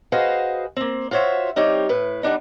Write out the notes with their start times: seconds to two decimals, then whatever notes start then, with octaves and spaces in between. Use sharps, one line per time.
0.12 F#4 G#4 B4 C5 D#5 F5
0.76 A#3 C4
1.11 F4 F#4 C5 C#5 E5
1.56 G3 C4 D#4 G4 C#5
1.89 A2 B4
2.23 G3 B3 D4 D#4